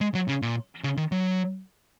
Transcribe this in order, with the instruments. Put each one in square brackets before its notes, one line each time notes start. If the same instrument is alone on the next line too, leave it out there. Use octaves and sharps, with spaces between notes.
[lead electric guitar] G#3
F#3
C#3
A#2
C#3
D#3
F#3